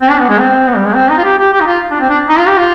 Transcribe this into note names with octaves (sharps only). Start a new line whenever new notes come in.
C4
D4
B3
G#3
C4
B3
G3
G#3
C4
D#4
F4
G4
G4
G4
D#4
F4
D4
C4
D4
D#4
F4
G4
F4